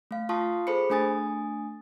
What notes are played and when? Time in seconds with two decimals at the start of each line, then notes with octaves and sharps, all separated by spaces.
0.11 A3 F5
0.29 F4 F5 A5 C6 C#6 D#6
0.67 G#4 A4 C5 B5 C#7
0.90 A3 D4 G#5 D#6 A6